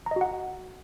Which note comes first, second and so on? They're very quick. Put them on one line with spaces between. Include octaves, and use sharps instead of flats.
A#5 D#5 F#4 F#5